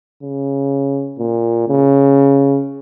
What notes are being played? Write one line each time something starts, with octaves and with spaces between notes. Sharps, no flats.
C#3
A#2
C#3